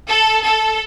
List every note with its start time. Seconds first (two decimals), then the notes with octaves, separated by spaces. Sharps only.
0.09 A4
0.42 A4